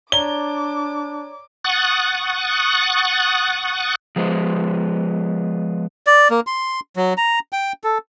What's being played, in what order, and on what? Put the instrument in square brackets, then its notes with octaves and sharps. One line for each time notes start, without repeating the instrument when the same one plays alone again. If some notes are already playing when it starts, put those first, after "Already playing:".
[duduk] D4 [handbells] C#5 D5 A#5 [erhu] D6 [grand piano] G7
[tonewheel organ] F#5 C#6 D#6 F#6 A6
[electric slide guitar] F3 G#3 B3 C5
[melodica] D5
A#3
C6
F#3
A#5
G5
A4